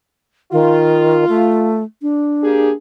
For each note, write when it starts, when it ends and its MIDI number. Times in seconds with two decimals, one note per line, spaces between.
0.52 1.25 51
0.52 1.76 65
1.29 1.83 57
2.02 2.74 62
2.43 2.70 58
2.43 2.70 67
2.43 2.70 68